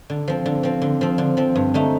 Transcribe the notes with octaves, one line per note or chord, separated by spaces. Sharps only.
D3
F3 C4
D3
F3 C4
D3
F3 C4
D3
F3 C4
G2
D3 A3 D#4